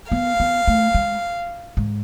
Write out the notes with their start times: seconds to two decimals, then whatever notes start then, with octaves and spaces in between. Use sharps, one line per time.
0.12 B3 F5
0.40 B3
0.67 A3
0.95 G#3
1.77 G#2